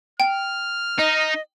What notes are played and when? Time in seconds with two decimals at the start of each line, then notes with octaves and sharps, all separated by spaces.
0.20 G5 F6
0.99 D#4 D#5